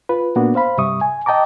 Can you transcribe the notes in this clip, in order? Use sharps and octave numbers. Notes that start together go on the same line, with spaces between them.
F4 B4
A#2 A#3 B3 D4 F#4
C5 F5 B5
G2 C3 G3 E5 C#6 D#6
G#5
D#5 G5 A5 A#5 D6